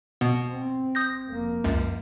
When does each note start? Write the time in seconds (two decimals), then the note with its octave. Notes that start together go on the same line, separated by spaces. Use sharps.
0.21 B2 B3
0.52 C4
0.95 D#6 G6 A#6
1.29 F1 A#3
1.64 C#2 F#2